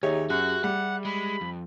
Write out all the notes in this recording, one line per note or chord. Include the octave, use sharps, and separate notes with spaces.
D#2 D#4 G4 G#4 C#5 E5
F#2 F#4 F#6
G3 F#5
G#3 B5
F2